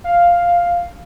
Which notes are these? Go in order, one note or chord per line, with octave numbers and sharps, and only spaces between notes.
F5